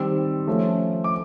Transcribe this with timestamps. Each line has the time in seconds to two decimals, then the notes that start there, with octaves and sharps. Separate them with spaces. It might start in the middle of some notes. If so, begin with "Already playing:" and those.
Already playing: D#3 G3 C4 E6
0.47 F3 A3 C#4 F4
1.04 D6